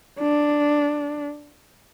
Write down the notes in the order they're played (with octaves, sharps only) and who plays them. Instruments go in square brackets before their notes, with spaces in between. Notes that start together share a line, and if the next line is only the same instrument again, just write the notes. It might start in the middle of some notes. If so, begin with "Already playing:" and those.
[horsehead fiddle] D4